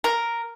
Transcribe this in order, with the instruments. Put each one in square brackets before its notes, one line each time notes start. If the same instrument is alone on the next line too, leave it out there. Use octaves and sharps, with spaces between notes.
[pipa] A#4